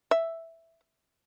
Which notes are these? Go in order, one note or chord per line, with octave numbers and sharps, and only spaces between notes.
E5